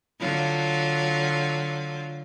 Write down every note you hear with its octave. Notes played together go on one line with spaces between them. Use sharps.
D3 F#3 F4